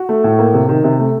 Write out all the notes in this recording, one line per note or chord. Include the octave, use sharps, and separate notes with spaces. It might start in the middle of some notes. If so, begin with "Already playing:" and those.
Already playing: F#4
A3
A2
A#3
C3
D#3
C3
A3